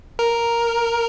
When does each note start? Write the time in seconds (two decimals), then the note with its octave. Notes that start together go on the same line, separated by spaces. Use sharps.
0.19 A#4